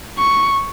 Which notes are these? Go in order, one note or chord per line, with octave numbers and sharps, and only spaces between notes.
C#6